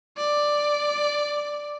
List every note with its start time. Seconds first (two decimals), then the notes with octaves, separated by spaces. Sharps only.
0.17 D5